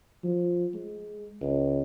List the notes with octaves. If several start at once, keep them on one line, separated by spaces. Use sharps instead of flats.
F3
G#3
C#2